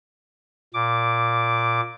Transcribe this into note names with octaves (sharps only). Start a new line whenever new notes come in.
A#2 D6